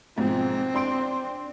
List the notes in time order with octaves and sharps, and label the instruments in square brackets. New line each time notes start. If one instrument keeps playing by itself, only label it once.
[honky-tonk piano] G#2 B2 F3 [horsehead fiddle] C4
[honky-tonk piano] D4 C6 D7